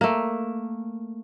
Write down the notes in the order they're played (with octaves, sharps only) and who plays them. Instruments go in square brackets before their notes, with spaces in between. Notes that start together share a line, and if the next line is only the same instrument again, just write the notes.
[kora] A3 A#3